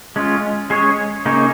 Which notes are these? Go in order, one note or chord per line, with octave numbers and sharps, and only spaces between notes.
G#3 C#4 F4
G#3 C#4 G#4 C#5
C#3 A#3 D#4 G#4 C#5